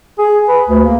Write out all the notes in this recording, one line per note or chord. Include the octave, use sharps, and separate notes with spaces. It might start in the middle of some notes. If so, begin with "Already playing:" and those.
G#4
B4
D2
A#3